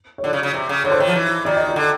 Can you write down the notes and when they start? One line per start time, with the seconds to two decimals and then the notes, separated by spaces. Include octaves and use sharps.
0.18 C#5
0.23 D3 D5
0.33 C#3
0.43 C#3
0.54 C3
0.69 C#3
0.84 D3 C#5
0.91 C5
0.99 D#3 C#5
1.07 F3
1.15 E3
1.45 D#3 D5
1.57 D#5
1.68 D5
1.76 D3